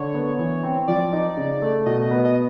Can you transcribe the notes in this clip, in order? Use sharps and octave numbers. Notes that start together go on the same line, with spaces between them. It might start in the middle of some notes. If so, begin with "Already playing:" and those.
Already playing: D3 C#5
B3
E3
C4
F3 D5
D#4
C#3
A3
B2 D#5
B3
D#5